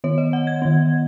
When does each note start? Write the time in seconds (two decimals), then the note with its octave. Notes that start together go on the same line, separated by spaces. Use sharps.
0.04 D#3 B3 C#5
0.18 D#5
0.33 F#5
0.47 G#6
0.62 D#3 B3